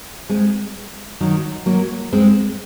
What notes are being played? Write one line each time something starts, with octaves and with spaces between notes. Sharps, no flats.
G#3 C4
D#3 F#3
F#3 A#3
G#3 C4